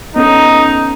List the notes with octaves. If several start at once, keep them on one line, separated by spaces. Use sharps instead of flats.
B3 C#4 D#4 A4